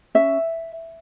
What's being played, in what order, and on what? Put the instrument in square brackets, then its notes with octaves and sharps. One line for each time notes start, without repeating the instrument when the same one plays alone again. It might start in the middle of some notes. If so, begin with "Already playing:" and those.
[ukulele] C#4 E5